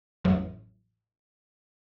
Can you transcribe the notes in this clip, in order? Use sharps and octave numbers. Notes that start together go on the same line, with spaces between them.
A1 F2 C#3 E3 F#3